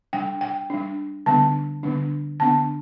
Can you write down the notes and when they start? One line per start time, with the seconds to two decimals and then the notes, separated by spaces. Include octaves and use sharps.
0.13 G3 D4 G5
0.41 G5
0.70 G3 D4
1.26 D3 G3 B3 D4 A5
1.83 D3 G3 B3 D4
2.39 D3 B3 D4 A5